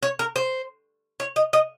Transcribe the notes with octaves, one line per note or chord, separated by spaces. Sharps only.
C#5
A#4
C5
C#5
D#5
D#5